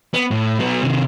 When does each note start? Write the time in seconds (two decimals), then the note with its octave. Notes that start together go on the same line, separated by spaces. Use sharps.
0.14 B3
0.31 A2
0.59 F#3 B3
0.83 C3 D#3